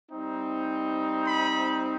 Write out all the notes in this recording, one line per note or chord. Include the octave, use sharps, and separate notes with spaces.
G3 C4 D#4
B5